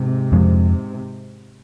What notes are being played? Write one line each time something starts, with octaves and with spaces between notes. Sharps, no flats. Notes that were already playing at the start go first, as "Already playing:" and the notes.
Already playing: G#2 C3
F2 F3 G#3